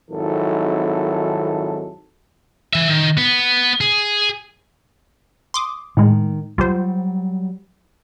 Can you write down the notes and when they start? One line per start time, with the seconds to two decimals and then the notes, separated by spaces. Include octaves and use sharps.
0.10 G#1 F2 D#3 F#3 E4 A4
2.73 E3 E5
2.89 D#3
3.18 B3
3.81 G#4
5.54 C6 D6 D#6
5.97 A2 D#3 G#3
6.58 F#3 G3 F4 G4 C5